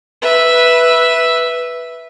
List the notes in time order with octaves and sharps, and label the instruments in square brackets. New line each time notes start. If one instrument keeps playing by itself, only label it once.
[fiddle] B4 E5